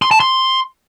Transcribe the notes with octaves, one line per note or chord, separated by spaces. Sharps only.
C6
A5
C6